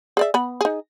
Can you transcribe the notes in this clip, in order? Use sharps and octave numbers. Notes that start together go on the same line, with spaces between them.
G#4 D5 E5
B3 B5
D#4 G#4